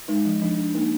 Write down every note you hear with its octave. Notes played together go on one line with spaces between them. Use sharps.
G#3 D#4
F3
F3 D4
D4
A#3 D#4